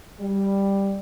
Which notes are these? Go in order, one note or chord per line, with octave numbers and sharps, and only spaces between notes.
G3